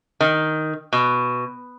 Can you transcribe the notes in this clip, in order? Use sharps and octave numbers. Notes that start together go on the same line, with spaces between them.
D#3
B2